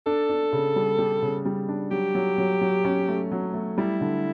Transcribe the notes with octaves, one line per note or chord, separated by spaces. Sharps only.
D4 A4
D4
C#3
G3
G3
C#3
G3
D4
F#3 G4
F#3
F#3
F#3
C#4
A3
F#3
A3
G3 E4
D3